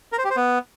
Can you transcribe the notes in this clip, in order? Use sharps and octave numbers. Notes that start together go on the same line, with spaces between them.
A#4
C5
G4
C5
B3